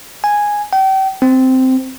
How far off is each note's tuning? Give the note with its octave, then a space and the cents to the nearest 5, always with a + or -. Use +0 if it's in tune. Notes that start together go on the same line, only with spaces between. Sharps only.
G#5 -5
G5 -35
C4 -10